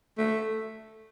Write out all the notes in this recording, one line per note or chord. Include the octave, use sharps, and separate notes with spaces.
A3